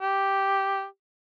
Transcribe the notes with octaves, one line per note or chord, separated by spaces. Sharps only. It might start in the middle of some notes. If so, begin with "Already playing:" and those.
G4